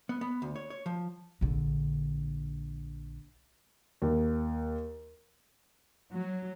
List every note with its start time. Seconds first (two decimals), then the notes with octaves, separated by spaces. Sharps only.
0.09 B3
0.21 B3
0.42 D2
0.56 C#5
0.70 C#5
0.86 F3
1.41 A#1 D3
4.02 D#2
6.14 F#3